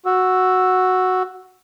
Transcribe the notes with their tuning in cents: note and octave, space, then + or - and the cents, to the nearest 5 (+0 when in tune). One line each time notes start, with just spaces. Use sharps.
F#4 +0 E6 +0